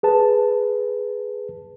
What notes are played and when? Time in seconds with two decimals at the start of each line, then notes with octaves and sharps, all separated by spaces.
0.03 G#4 B4 A5